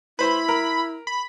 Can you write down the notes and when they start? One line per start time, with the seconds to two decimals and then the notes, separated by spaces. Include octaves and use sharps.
0.19 E4 B4 C5 B5 C6
0.48 A#4
1.07 B5